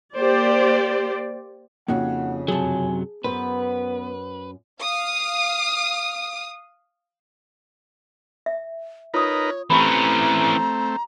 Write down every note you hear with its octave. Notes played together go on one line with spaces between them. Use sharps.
A#3 G4 C5 D5
F2 C#3 A#3 D#4 F#4 F#5
F#2 C3 F#3 G#4 G#5 A5
F#2 B3 B4 C5
F5 D#6
E5
D#4 F4 A#4 B4 C#5 D#6
E3 A3 C4 C#4 G4 A#5 B5